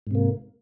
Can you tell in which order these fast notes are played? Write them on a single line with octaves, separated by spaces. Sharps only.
G#2 C3 A#3